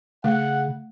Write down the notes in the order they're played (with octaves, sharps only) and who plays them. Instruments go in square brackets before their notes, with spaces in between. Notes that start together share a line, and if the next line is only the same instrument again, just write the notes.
[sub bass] C#3 [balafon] A3 [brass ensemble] F#5